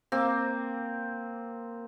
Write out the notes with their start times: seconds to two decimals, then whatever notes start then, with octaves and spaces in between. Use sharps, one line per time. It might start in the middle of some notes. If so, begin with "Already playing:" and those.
0.12 A#3 C4